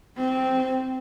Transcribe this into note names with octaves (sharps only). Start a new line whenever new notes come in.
C4